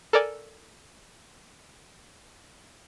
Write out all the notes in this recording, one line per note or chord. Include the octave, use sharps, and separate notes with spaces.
A4 A#4 D5 G#5